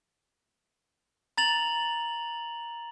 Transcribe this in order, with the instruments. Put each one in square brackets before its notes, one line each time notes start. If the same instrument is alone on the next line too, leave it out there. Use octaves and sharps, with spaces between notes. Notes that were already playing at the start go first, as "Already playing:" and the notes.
[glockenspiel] A#5 A6 F7 F#7